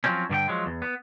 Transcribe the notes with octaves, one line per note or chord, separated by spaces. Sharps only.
F3 F#3 C4 C#4
G2 D3 G4 G5
F3 F#3 G#3
E2
B3